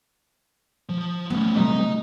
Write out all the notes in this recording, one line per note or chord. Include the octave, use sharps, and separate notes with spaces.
F3
A3 B3 C#4
C3 F#3 G3 D#5 A#5